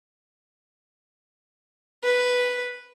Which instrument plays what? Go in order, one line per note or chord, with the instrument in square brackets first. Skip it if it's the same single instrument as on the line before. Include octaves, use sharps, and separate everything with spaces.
[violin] B4